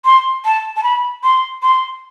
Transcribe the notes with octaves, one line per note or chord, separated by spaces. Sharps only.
C6
A5
A5
B5
C6
C6